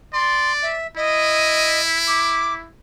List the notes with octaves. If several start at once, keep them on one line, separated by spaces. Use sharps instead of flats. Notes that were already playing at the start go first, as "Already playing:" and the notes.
D5 C6
E5
E4 D#5
D6